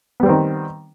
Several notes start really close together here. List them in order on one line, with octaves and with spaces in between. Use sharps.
B3 G3 C4 D#3